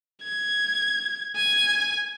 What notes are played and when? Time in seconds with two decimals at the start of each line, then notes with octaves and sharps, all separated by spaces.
0.23 G#6
1.36 G#5